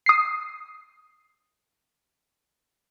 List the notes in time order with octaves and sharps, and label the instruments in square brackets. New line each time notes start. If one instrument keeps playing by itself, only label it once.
[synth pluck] D#6 C7